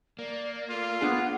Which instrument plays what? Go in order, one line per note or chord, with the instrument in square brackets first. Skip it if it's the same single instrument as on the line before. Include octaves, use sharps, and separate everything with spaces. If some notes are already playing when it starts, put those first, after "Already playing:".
[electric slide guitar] A#3 [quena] D5
[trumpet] F4 [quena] A4
[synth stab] B3 D4 G#4 [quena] F#5